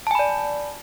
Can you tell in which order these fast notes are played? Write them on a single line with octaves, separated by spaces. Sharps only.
A5 G#5 B5 D5